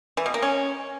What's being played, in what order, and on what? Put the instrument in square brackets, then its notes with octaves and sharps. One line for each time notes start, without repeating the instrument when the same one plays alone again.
[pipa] E3
B2
A#3
C#4